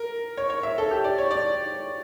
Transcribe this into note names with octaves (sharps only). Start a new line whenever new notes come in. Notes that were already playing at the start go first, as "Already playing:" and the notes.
Already playing: A#4
C#5
C#5
E5
A4
G4
D5
C#5
D5